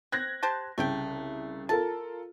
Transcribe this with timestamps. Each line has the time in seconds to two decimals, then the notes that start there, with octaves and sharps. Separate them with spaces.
0.12 C4 F#6 G#6 A#6
0.43 G4 C5 A5
0.78 C2 C#3 A3 G4 G5
1.69 F4 A4 A#4 A5